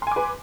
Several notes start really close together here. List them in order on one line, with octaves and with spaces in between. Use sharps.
C6 G#5 D6 B4